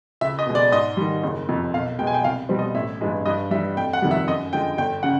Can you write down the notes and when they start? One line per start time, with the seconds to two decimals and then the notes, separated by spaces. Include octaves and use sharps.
0.21 C#2 E5
0.39 D#5
0.46 B2 G#3
0.55 D5
0.72 G#2 D#5
0.97 D#3 G3
1.23 F#1
1.49 F2 C3
1.73 B1 F5
1.99 B2 G#3 G5
2.07 G#5
2.14 G5
2.24 C2 F5
2.49 B2 G3 C4
2.59 D#5
2.75 A1 E5
3.01 G2 E3 G#3
3.26 G2 D#5
3.51 G3 E5
3.54 E3
3.77 F1 G5
3.93 F#5
4.02 F2 C3 D#3 G3
4.11 E5
4.27 F#2 D#5
4.53 D3 F3 G#3 G5
4.78 G1 G5
5.03 C#3 F#5